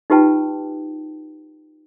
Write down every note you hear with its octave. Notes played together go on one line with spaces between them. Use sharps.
D#4 F4 G4 B4 G5 A5